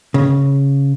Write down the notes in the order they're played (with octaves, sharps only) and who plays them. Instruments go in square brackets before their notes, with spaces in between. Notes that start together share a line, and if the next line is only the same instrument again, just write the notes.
[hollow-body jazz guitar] C#3